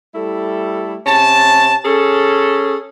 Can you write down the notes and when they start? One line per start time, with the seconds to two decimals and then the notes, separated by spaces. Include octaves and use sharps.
0.14 G3 A3 E4 A4
1.06 C3 C#4 A5
1.85 C#4 G#4 A4